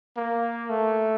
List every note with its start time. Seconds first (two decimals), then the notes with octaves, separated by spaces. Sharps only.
0.17 A#3
0.70 A3